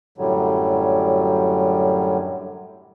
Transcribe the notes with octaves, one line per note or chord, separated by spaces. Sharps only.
F#2 A2 D3 F#3 G3